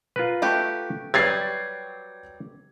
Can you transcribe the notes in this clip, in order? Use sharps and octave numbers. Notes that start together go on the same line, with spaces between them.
F4 A#4 B4
A3 F#4 G4
F#3 G3 G4 B4 G#6 A6 C7